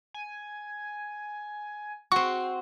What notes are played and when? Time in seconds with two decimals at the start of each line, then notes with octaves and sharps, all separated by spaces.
0.14 G#5
2.12 C4 F#4 C#6 C7